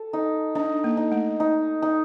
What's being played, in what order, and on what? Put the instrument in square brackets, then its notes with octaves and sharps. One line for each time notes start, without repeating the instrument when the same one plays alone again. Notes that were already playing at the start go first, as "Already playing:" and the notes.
Already playing: [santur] A4
D#4
[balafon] D4 [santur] D#4
[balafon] A#3
[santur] D#4
[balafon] A3
[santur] D#4
D#4